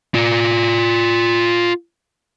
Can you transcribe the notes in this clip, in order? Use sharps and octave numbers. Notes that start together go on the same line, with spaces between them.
F4 D5